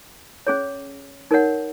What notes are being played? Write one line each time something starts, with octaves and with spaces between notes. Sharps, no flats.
C#4 G#4 C#5
D#4 A#4 C#5 F#5